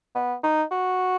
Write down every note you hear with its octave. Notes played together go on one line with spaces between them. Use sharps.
B3
D#4
F#4